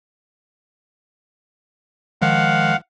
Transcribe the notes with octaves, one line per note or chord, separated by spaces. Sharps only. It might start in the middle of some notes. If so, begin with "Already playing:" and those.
D#3 F3 G#3 F5 F#5